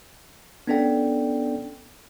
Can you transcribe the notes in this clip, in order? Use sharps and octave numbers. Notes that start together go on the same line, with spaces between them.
B3 C#4 D4 A4 D5 G5